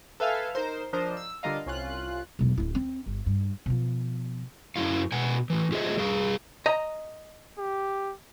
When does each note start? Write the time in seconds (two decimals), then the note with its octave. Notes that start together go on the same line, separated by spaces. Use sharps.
0.20 A4 B4 E5 F5 G#5 F6
0.55 D#4 A#4 C5
0.93 F3 D4 A#4 C5 D#5
1.17 E6
1.43 D3 G3 F4 A#4 D#5 F5
1.66 C2 C#4 F4 F#6
2.39 E1 B1
2.58 D1 E4
2.75 C4
3.06 G1
3.26 G2
3.66 B2 F3
4.76 F#2 F#3 E4 F5
5.12 B2 F#5 G#5
5.50 A2 E3
5.72 F4 G4 G#4 C5 D#5 E5
5.97 G3 G#4 F5
6.66 D#5 A#5
7.59 G4